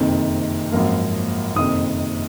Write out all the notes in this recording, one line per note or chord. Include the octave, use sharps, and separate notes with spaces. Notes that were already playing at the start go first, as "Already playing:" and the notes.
Already playing: F#1 F2 C3 D#3
G#1 F#2 F3 A#3
F#1 F2 C3 D#3 D#6